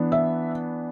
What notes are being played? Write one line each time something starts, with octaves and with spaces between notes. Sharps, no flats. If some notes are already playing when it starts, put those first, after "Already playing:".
Already playing: E3 B3 D4
E5